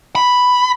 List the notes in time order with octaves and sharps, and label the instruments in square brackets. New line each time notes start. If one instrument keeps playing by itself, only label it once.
[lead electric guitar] B5